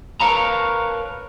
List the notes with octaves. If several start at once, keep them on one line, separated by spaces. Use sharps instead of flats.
A#4 B4 C#5 F5 A5 A#5